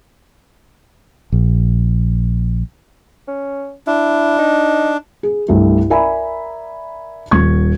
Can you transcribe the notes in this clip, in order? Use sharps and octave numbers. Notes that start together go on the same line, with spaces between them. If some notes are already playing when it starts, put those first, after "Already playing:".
A#1
C#4
D4 E4
D#4
G#4
C2 G2 A3
A#4 D5 E5 G#5 A#5 B5
D#1 C#6 G#6